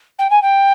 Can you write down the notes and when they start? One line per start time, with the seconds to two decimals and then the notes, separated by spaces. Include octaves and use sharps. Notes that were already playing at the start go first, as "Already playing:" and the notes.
0.18 G5
0.30 G#5
0.42 G5